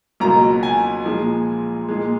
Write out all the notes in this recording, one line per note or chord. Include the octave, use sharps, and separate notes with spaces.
C#2 B2 F#3 A#3 A#5
G#5
A#2 F3 G#3
A#2 G#3